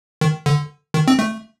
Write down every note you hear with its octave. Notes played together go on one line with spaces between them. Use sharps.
D#3
D3
D#3
C4
A3